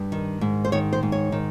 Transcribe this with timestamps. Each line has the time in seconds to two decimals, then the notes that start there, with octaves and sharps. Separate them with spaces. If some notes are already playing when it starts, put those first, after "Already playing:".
Already playing: G2
0.12 D#3
0.41 G#2
0.65 C5
0.72 D#3 C#5
0.93 C5
1.03 G#2
1.12 C#5
1.32 D#3